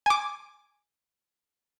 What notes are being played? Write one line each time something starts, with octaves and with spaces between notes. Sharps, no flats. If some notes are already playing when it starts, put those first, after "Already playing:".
G#5 D6